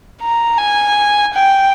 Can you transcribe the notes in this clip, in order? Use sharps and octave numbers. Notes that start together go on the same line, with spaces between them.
A#5
G#5
G5